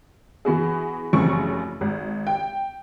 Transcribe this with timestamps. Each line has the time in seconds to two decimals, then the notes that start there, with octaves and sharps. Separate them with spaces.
0.45 E3 B3 F#4 G#4
1.13 F1 F#2 C#3 E3 C4 C#6
1.81 G#1
2.27 G5